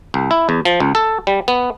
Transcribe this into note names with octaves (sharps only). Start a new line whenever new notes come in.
C2
E4
E2
F3
C#2
A4
G3
B3